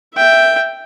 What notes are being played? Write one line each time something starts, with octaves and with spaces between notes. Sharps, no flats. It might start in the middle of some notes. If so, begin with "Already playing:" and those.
E5 G5